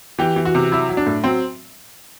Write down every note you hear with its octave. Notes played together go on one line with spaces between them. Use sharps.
E3 G4
E3
F#4
C3
F#3 E4
F#3
D4
A2
F#3 C4